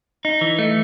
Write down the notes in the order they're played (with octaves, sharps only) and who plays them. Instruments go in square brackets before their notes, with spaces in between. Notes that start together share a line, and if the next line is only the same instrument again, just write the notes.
[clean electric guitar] D#4
E3
A3